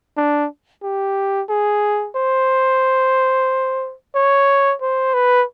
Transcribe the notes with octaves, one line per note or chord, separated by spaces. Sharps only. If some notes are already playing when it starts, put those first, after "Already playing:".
D4
G4
G#4
C5
C#5
C5
B4